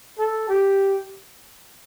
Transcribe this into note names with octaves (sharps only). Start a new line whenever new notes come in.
A4
G4